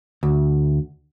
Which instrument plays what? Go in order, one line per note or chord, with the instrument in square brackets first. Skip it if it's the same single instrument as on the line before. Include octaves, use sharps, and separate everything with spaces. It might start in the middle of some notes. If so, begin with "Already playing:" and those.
[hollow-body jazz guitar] D2